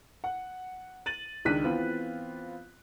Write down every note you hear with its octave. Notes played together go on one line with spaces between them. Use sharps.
F#5
A6 D#7 F#7
C#2 D#3 D4 F#6 B6 D#7
E3 B3 C4 F4